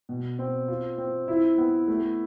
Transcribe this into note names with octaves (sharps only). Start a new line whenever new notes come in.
B2
C4
F4
C4
E4
B3
A3